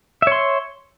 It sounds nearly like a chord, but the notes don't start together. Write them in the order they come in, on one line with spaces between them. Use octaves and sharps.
E5 C#5 C6